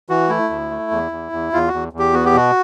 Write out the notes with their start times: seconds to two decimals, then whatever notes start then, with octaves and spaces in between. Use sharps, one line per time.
0.09 E3 F#4
0.29 A3 E4
0.50 D2
0.71 A3
0.91 E2
1.12 E2
1.32 E2
1.53 E2 F4
1.68 F#4
1.74 E2
1.93 E2
1.99 G4
2.13 B3 F#4
2.26 G4
2.34 B2 F#4